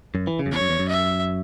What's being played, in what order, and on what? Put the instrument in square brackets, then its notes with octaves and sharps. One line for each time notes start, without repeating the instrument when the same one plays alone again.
[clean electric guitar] F#2
E3
C#3
F#2
[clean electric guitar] E2 [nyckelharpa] C#5
[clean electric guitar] F#2
E2
F#2
[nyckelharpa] E5